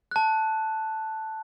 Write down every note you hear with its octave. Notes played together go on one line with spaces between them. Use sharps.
A5 F#6